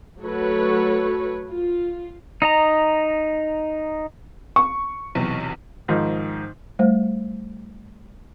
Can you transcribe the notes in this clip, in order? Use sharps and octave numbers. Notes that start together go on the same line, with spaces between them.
F#3 A3 F#4 A4 B4 C#5
F4
D#4 D#5 A#5
C#6
B1 E2 C3
G#2 D#3 F3
G3 A3 C5